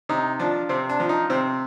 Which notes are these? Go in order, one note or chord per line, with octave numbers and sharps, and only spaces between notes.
C3 D#4
F3 D4
C3 C4
D4
F3
D#4
C3 C4